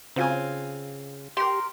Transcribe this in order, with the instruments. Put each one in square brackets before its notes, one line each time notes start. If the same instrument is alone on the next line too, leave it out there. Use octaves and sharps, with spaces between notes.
[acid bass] C#3 [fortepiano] C4 F4 G#5
[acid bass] G4 [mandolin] A#4 C6